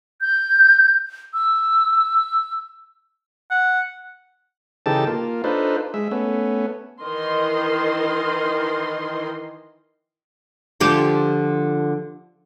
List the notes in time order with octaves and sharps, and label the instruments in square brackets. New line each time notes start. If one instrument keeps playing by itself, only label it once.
[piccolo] G6
E6
[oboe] F#5
[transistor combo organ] C#3 E3 D#4 G4 A4 A5
A#3 F4
D4 D#4 F4 A4 B4 C5
G#3 E5
A3 B3 C#4
[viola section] D#3 E3 A#4 D#5 C6
[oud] D3 F3 G4